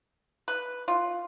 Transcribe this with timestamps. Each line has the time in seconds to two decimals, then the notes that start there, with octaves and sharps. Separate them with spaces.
0.48 B4
0.88 F4